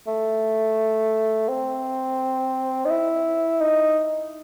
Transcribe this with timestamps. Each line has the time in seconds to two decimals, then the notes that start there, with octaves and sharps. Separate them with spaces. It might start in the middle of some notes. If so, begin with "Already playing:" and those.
0.07 A3
1.48 C4
2.85 D#4
2.91 E4
3.61 D#4